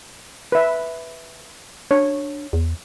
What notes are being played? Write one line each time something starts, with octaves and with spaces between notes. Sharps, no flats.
B4 E5
D4 C#5
E2